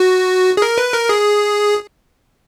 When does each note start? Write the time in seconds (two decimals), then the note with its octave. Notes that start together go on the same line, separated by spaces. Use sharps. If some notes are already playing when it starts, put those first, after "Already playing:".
Already playing: F#4
0.57 G#4
0.62 A#4
0.78 B4
0.94 A#4
1.09 G#4